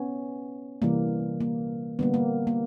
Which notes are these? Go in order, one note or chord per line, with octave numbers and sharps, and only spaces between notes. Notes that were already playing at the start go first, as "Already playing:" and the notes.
Already playing: B3 C#4
C3 E3 G3 A#3
A#3
D3 G3 A#3 B3
A#3
A#3